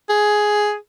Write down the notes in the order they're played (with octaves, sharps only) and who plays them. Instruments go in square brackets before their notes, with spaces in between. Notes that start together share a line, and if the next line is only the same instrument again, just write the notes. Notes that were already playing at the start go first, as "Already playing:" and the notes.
[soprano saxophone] G#4